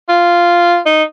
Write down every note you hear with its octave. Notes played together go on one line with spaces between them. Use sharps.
F4
D#4